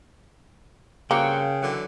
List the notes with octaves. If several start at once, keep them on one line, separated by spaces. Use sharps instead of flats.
G2 C#3 A#3 C4 F#4 G5
D3 E3 F#3